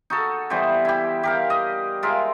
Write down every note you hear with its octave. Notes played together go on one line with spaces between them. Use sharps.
D#4 F#4 A4
E3 G3 B3 C5
E4 G4
G4 A#4 F5
D#5
G#3 F4 A#4 E5